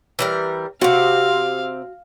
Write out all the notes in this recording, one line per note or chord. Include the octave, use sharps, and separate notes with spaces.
E3 G3 A#4
C3 C4 F#4 F5